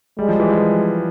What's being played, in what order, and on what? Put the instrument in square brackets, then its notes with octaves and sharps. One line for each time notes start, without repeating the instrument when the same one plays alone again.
[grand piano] G3 [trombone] G#3
[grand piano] F3
E3
F3